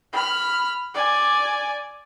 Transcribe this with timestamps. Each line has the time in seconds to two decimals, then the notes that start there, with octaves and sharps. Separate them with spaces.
0.13 B5 F6
0.94 D5 G#5